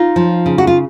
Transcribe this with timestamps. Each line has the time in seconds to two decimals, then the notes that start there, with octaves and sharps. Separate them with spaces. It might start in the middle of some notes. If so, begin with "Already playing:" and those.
Already playing: D#4 F4
0.16 F3
0.46 C#3
0.58 F#4
0.67 F4